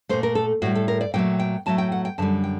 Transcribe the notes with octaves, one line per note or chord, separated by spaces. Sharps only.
A#2 A3 C5
A#4
A4
A2 G3 F#4
A4
A#4
D5
A#2 F#3 A3 G5
G5
A2 F#3 A3 A5
G5
F#5
G5
F#2 D3 G3 A5
G5